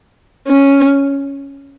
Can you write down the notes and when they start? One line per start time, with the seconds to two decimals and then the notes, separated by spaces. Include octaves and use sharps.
0.48 C#4